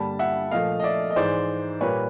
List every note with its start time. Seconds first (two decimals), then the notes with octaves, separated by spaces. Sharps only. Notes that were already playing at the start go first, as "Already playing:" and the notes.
Already playing: G2 D3 G3 A#3 A5 B5
0.19 E5 F#5
0.51 A#2 F3 A3 D#5 F5
0.80 D#5
0.83 D5 E5
1.11 D#5
1.16 G#2 E3 G#3 C5 D5
1.81 A#2 G3 A#3 B4 C#5